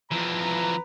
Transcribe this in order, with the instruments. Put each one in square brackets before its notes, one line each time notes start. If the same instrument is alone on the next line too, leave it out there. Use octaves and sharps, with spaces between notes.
[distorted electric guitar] F2 E3 [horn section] B4 A#5